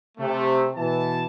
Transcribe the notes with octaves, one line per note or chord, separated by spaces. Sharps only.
C3 A3
B2 E3 A5